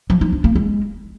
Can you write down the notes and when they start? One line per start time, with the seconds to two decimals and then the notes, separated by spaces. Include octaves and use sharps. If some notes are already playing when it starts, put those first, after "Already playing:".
0.10 F3
0.21 D#4
0.33 D4
0.44 A#3
0.55 G#3